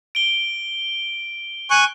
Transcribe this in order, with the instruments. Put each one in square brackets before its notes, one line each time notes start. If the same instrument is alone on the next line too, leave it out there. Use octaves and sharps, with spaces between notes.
[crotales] D7 G7
[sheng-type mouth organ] G#5 C#6 F#6